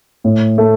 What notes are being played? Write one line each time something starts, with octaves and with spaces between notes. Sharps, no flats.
A2
A3